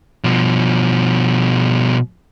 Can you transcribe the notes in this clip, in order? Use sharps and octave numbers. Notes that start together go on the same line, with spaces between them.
B2 F3